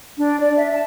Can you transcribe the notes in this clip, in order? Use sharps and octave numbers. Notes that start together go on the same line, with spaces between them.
D4
D5
E5
A5